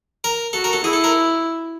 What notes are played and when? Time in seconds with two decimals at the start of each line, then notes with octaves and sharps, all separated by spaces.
0.24 A#4
0.53 F#4 A4
0.64 A#4
0.73 A4
0.83 E4 G#4
0.93 A4
1.04 A#4